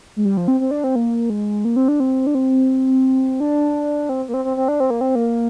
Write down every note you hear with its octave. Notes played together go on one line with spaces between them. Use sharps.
G#3
G3
F3
C4
C4
D4
C4
A#3
G#3
A#3
C4
D4
C4
D4
C4
D4
C4
A#3
C4
C4
C4
D4
C4
A#3
C4
A#3